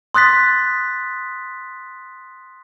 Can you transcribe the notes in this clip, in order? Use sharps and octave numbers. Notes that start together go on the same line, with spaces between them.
C6 D#6 F#6 A6 B6